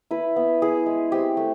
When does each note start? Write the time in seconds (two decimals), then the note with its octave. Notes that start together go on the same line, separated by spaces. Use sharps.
0.11 E4 B4
0.36 B3
0.62 E4 G#4
0.86 G#3
1.12 C4 G4
1.37 A3